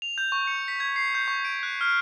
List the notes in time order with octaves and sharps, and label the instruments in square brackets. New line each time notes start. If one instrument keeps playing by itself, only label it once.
[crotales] F7
G6
C#6
C#7
B6
G#6
C7
G6
C#6
D7
F#6
F6